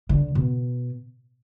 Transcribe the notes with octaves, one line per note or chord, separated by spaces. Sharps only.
D3
B2